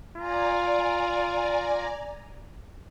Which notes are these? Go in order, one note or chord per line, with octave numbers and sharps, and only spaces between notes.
F4 D5 G#5 A#5